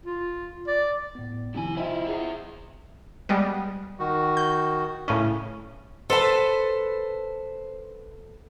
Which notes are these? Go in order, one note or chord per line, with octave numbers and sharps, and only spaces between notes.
F4
D5
A2 B3
C3 D#3 F3 E4 G#5
E4 F4 C5 D#5 G5
E4 G#4
G3 G#3 B3
D#3 F#4
G6
A2 C#3 C#4
A4 B4 C5 A5